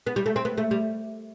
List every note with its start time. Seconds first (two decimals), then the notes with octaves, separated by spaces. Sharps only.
0.06 B3
0.16 G3
0.26 A3
0.36 C4
0.45 B3
0.58 A3
0.71 G3